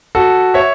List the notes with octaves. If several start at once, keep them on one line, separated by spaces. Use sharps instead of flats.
F#4 A4
C#5 E5